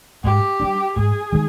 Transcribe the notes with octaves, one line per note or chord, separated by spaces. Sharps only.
G#2 G4
G3 D4
G#2 G#4
D#3 G#3